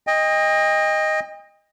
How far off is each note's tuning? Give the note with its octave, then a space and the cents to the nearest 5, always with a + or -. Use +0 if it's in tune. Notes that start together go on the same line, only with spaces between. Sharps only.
D#5 +0 G5 +40